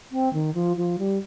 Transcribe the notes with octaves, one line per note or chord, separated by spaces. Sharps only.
C4
D#3
F3
F3
G3